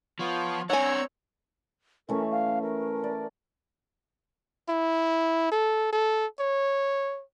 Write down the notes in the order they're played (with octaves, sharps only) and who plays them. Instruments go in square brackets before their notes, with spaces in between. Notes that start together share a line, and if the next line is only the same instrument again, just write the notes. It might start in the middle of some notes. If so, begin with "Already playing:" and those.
[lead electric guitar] F3 [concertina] B3 F4 C#5
[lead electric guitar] C4 D4 [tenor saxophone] C#5 [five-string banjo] F#5 G#5 [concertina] A#5 E6
[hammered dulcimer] E3 A3 C#4 [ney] A#4
[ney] F5
A#4
[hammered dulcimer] D5
[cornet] E4
A4
A4
C#5